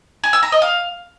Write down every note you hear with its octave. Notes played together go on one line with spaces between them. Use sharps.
G#5
E6
A#5
D#5
F5